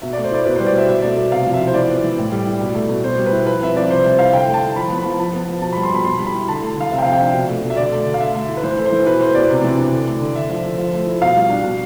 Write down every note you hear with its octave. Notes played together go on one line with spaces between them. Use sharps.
B2 E5
A3 D5
C5
E4 D5
B2 B4
G3 C5
D5
B2 E5
B2 E5
A3 D5
B2 E5
C3 F5
F3
E5
E4
C5
E3 D5
B3
E3
A2
G3
E4
B2
A3
B2
B2 C5
G3
B4
E4
F3 B4
C4 E5
F3 D5
C3 C5
G3 E5
E4 F5
D3 G5
A3
A5
E4
F3 B5
B3
B5
F3
F3 A5
B3
F3
B2 A5
G3 B5
C6
B2 B5
B2 C6
G3
B5
E4
D3 A5
A3
D3 F5
C3 E5
G5
F3 F5
G5
D4 E5
B2
A3
B2
E5
D3 D5
A3
D3
F5
D3 E5
A3
E4
B4
E3 C5
A3
C5
E3
B2 B4
A3 C5
B2 D5
C3
E3
D4
D3
A3
D3
D3 E5
F3
D3
F3
A3
E4
B2 F5
G3
D4
B2